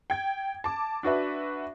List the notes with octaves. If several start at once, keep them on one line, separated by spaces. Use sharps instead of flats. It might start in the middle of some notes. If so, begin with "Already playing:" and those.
G5 G#6
A5 D6
D4 F#4 B4 E5